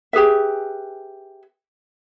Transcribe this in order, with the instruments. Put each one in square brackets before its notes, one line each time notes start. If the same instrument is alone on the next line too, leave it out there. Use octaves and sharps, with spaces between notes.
[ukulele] G4 G#4 B4 E5